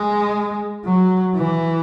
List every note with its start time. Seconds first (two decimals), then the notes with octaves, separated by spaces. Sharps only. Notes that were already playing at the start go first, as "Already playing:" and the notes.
Already playing: G#3
0.85 F#3
1.35 E3